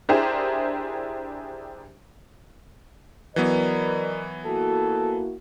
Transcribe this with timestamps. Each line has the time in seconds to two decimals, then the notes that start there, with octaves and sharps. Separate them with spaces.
0.09 D4 E4 G4 G#4 A#4 C5
3.36 E3 F#3 B3 A#4 B4 D5 D#5
4.45 A#3 E4 F#4 A4